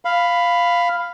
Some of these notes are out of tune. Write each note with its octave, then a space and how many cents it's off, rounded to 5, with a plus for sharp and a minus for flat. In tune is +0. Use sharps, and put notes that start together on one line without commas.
F5 +0 B5 +10